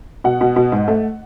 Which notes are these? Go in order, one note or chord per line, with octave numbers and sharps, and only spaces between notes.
B2 F#5
B2
B2
G#2
A3